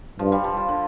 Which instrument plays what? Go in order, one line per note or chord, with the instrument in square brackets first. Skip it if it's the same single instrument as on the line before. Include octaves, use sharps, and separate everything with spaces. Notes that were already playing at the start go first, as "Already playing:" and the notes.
[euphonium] G2 [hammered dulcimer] F3
[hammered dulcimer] G3
F3
F3
D3